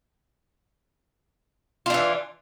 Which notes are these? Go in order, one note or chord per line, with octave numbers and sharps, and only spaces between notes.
E3 D4 F4